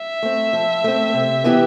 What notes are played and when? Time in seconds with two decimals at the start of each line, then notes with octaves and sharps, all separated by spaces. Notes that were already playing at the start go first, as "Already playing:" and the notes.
Already playing: E5
0.22 A3 C4
0.53 F3
0.84 A3 C4
1.14 C3
1.44 E3 B3 E4 G4